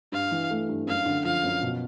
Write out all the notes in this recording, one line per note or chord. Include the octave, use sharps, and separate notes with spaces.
G2 F5
E3
A3
G2
F#2 F5
D3
F3 F5
F#2
B2